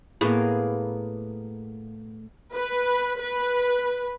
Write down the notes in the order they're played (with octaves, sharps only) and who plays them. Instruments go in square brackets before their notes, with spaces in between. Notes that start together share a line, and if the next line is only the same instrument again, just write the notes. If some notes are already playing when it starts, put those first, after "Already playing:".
[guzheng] A2 [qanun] A#3 B3 G#4
[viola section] B4
B4